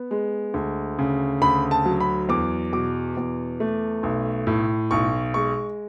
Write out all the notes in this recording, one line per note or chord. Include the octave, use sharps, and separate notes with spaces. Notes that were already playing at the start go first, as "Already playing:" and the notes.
Already playing: B3
G#3
D2
C#3
D2 B5
A5
F#3
B5
E2 D6
B2 D6
E2
A3
B1
A2
B1 C#6
G#3 C#6